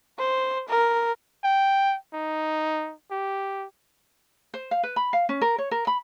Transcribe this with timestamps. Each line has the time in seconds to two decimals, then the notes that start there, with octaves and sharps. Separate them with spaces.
0.18 C5
0.69 A#4
1.44 G5
2.14 D#4
3.11 G4
4.54 C5
4.71 F5
4.83 B4
4.96 B5
5.13 F5
5.29 C#4
5.41 A#4
5.58 C#5
5.71 A#4
5.87 B5